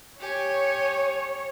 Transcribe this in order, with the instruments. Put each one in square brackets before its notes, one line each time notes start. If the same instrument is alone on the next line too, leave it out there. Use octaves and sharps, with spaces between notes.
[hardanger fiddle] G4 G#5 [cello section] C#5